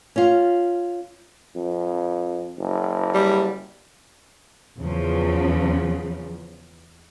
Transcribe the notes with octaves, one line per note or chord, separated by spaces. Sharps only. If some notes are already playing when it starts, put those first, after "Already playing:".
C#4 F4
F2
F#1
G3
E2 C#3 F3